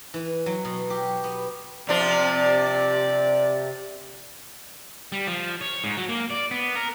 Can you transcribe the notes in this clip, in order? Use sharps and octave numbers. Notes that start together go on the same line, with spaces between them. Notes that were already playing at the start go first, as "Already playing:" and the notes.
E3
F#3
B2
G4
B3
C3 F3 D4 C5 D5
G3
F3
C#5
G#2
F#3
A#3
D5
B3
A#4